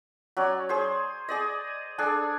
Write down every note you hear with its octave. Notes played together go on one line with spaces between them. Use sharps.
F#3 C#4 D5
G#4 C5
G#4 D5 D#5
D4 G#4 A4